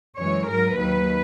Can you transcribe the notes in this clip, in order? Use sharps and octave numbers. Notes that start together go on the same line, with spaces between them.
F#2 E3 G#3 C#5
G#2 F#3 A#4
D#2 D#3 F#3 B4